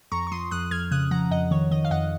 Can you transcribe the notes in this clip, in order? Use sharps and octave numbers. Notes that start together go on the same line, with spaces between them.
F2 A#5 C#6
C#6
F3 C6 D#6
F2 D#6 F#6
F2 F6 G#6
C#3 D#6 F#6
F3 F#5 A#5
F2 D#5 F#5
D#3 C#5
D#3 D#5
F5
F2 D#5 F#5